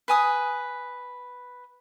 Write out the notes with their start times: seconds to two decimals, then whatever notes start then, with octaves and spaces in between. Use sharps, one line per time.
0.08 B4 G#5 D#6